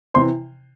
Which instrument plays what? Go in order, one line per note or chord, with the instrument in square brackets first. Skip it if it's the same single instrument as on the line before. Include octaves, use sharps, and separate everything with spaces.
[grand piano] C3 E3 C5 C6